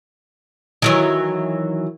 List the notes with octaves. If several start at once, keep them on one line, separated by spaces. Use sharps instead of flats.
D#3 E3 F#3